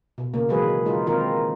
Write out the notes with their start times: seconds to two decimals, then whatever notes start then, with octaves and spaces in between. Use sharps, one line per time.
0.18 B2
0.34 C#3 A#3
0.49 D#3 E3 F#3 G#3 G#4 B4
0.85 G#3 D#4 F4
1.07 D#3 C4 D#4 F4 A#4